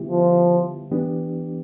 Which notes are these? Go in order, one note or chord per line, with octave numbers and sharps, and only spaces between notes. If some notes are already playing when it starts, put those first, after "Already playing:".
Already playing: D3 G3 B3 E4 G4
F3
E3 B3 D4 G4